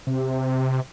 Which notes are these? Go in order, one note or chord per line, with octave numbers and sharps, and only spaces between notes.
C3